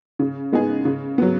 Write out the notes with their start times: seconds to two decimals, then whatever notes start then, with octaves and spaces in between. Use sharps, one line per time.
0.19 C#3
0.52 G#3 B3 D#4 G#4
0.85 C#3
1.18 F#3 B3